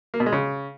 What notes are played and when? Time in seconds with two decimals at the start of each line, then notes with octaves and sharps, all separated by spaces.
0.14 A#3
0.20 B2
0.26 G#3
0.32 C#3